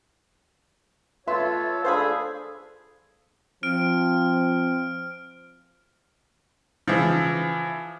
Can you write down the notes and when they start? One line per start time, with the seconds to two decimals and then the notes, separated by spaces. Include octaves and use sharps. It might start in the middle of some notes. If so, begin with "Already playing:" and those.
1.27 F4 A4 B4 C#5 E5 C6
1.85 D4 G#4 A4 C5 F5 B5
3.63 F3 C4 F6 D7
6.87 C#3 E3 F3